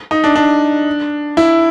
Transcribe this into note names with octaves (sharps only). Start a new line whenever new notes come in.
D#4
D4
D4
E4